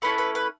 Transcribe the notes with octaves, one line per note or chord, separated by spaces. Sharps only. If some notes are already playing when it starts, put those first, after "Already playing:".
A3 C#4 E4 A4 B4
B4
B4